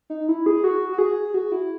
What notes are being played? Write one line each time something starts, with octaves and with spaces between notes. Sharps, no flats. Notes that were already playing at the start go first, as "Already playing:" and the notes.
D#4
E4
G#4
F#4
F#4
G#4
F#4
E4